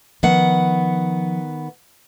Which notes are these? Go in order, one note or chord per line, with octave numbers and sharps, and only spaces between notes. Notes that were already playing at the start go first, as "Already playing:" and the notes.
D#3 F3 B3 F#5